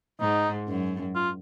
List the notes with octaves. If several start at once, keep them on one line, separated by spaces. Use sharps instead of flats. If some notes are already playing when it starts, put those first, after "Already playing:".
G#2 D#4
F#2
F4